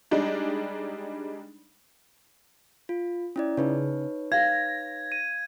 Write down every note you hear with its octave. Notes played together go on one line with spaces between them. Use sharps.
G3 G#3 D4 D#4
F4
C#4 E4 D5
C#3 D#4 B4 C#5
F5 G#6 A#6
D#7